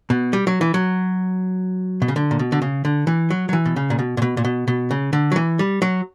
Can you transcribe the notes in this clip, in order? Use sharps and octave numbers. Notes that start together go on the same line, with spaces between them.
B2
G3
F#3
E3
F#3
B2
C#3
D3
A#2
B2
D3
C#3
D3
E3
F#3
F#3
E3
B2
C#3
A#2
B2
A#2
B2
A#2
B2
B2
C#3
D3
F#3
E3
G3
F#3